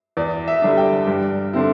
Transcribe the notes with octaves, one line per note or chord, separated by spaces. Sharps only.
E2 D5
E5
D3 G3 D4
G5
G2
D3 C4 E4